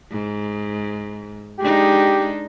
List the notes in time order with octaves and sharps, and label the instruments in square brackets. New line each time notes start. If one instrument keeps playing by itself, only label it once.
[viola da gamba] G#2
[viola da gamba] G#3 D4 D#4 [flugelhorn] G4